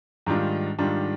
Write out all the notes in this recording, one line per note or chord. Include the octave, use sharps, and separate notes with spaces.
G#2 D#3 G3 D4 F4
G#2 D#3 G3 D4 F4